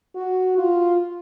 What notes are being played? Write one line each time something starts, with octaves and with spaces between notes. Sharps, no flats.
F#4
F4